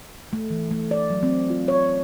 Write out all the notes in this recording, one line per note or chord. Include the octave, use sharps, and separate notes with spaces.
A3
E3
A3
D5
F#3
C4
F4
C#5